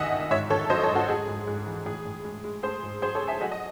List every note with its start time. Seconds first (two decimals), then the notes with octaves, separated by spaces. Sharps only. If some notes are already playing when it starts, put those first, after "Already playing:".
Already playing: C2 D#3 A3 D#5 E5 F#5 G#5
0.12 D#3
0.31 G#2 C#5 E5
0.50 D#3 A4 C#5
0.70 F#3 C5 D#5
0.83 A4 C#5
0.89 G#2
0.95 F#4 A4
1.08 G#3 G#4
1.28 G#2
1.47 G#2
1.66 E3
1.86 A2 G#4
2.05 A2
2.25 G#3
2.44 G#3
2.63 A3 G#4 C5
2.83 G#2
3.02 F#3 G#4 C5
3.15 A4 C#5
3.22 A3
3.28 E5 G#5
3.41 F#3 D#5 F#5
3.52 D#5